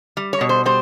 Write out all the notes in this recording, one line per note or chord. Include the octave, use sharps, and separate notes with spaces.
G3
C#5
B2
C5
G3 C5